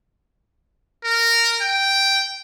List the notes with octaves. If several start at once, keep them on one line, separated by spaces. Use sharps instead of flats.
A#4
G5